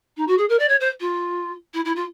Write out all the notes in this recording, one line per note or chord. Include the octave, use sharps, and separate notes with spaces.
D#4
F#4
G#4
A#4
D5
C#5
C5
F4
E4
E4
F4